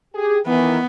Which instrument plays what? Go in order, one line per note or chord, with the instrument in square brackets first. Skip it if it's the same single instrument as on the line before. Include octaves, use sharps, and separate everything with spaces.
[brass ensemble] G4 G#4
[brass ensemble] D#3 E3 [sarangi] B3